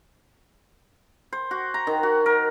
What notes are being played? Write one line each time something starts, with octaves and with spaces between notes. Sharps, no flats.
C5
F#4
A#5
D#3
F#4
A#4